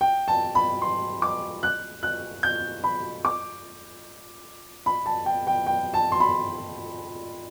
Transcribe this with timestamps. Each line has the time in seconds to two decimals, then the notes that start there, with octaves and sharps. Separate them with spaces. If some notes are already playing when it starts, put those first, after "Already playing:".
0.01 G5
0.28 A5
0.55 B5
0.82 C6
1.22 D6
1.63 F#6
2.03 F#6
2.43 G6
2.84 B5
3.25 D6
4.86 B5
5.06 A5
5.26 G5
5.47 G5
5.66 G5
5.94 A5
6.12 C6
6.20 B5